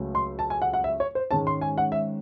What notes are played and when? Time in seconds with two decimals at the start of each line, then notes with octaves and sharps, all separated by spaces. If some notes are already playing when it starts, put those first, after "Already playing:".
Already playing: C#2 C#3 F#3 A3 C#4
0.15 C6
0.39 A5
0.50 G#5
0.62 F#5
0.73 F#5
0.84 E5
1.00 C#5
1.15 C5
1.31 G#2 D#3 G#3 C#4 A5
1.47 C6
1.62 G#5
1.78 F#5
1.92 E5